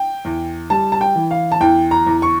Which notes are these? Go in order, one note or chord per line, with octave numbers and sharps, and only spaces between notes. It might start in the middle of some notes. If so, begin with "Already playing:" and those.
Already playing: G5
E2
G3 A5
A5
G5
E3
F5
A5
E2 G5
A#5
E2
C#6